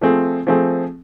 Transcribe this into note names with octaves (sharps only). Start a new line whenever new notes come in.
F3 A3 C4 G#4
F3 A3 C4 G#4